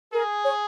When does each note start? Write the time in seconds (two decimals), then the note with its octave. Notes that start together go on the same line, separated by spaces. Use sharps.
0.12 G#4 A#4
0.45 C#5